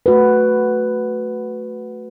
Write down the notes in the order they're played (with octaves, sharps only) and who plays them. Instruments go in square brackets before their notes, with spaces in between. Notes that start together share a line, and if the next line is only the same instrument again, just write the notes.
[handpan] A3 F#4 B4